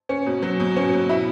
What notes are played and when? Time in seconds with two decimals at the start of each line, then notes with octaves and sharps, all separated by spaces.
0.09 C#4
0.26 B2
0.42 F#3
0.60 B2
0.76 C#4
0.93 B2
1.09 E4